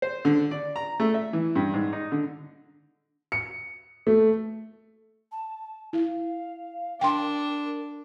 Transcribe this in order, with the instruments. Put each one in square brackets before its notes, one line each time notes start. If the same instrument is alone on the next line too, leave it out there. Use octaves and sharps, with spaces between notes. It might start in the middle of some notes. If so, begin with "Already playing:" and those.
[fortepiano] C5
D3
D5
A#5
A3
E5
E3
G2
G#2
D#4
D3
[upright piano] C#7
A3
[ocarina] A5
[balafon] E4 [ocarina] F5
[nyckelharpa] D4 [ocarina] A#4 [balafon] G5 C6